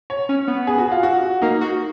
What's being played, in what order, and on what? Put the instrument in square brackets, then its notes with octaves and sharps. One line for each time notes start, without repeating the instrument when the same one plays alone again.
[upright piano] C#5
[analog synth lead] C#4
B3
[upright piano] G#4
F#4
F4
F#4
[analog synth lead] A#3 [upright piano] D#4
[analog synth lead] F#4